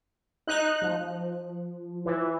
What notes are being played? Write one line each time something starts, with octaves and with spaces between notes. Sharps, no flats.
D#4 F#6
F3
E3